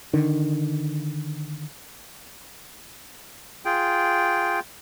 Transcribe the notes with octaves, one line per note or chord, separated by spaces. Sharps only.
D3 D#3
F4 G#4 G5